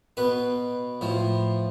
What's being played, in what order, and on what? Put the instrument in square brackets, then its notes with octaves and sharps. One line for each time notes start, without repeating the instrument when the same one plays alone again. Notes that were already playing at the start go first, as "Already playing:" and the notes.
[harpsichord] B2 B4
A2 F3